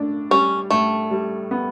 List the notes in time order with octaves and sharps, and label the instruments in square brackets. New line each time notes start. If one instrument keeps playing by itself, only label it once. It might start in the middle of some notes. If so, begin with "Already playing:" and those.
Already playing: [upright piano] A2 D4
[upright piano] G3 [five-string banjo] C#4
[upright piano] A2 [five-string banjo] A3
[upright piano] G3
B3